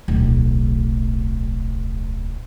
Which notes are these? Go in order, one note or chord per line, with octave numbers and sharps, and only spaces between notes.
D1 B1